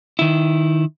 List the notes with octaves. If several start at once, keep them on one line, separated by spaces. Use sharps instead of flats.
D#3 E4